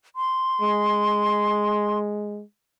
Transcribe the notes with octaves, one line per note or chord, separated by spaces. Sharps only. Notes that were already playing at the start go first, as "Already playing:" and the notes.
C6
G#3